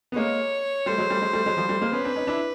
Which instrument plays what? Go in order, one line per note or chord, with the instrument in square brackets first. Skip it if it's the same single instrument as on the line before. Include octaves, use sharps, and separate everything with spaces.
[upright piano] B3
[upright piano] G#3 A#3 [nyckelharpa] C#5
[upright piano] G3 A3 [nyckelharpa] C5
[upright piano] F#3 G#3
G3 A3
F#3 G#3
G3 A3
F#3 G#3
F3 G3
G3 A3
G#3 A#3
[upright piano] B3 C#4 [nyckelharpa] B4
[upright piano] C4 D4
C#4 D#4
D4 E4